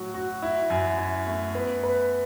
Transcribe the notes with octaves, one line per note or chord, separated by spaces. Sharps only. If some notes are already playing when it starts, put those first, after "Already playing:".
Already playing: A2 F#3 F#4
F#4
E4
F#2
E4
A3
B3
B4